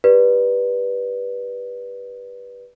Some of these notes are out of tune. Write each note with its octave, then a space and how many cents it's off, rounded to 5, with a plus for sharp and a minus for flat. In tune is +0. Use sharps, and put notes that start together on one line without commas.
G4 +0 B4 -15 D5 +0